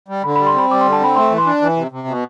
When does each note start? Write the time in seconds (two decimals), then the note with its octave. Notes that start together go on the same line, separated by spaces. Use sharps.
0.08 G3
0.24 D3 B5
0.36 B5
0.39 G3
0.47 C6
0.54 C4 B5
0.70 G3 D6
0.81 C6
0.85 D3
0.92 A5
1.00 C4 B5
1.16 A3 C6
1.30 E3
1.38 C6
1.46 D4
1.62 E3
1.76 C3
1.91 C3
2.08 B2